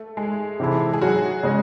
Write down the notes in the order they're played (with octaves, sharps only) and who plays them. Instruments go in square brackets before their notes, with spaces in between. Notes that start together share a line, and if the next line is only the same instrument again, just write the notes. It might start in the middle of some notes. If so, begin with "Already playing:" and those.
Already playing: [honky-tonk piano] A3
G#3 G#4
[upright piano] C3 E3 C4 E4 A4
[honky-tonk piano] G#4
F#3 F#4
[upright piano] C#3 G#3